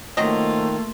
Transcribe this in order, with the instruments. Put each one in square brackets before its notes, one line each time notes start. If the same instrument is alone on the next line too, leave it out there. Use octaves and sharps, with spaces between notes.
[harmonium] D#3 [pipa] F#3 C4 D#5 [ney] A3 [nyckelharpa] A#3 F4